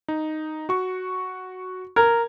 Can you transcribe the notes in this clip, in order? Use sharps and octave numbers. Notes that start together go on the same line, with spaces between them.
D#4
F#4 C#6
A#4 G#6